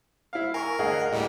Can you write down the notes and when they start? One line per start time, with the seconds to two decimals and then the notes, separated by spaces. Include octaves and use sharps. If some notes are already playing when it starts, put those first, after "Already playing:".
0.33 E4 F5
0.54 A#4 G#5 C#6
0.79 D2 G#4 D#5 F5 F#5
1.13 A2 G3 A#3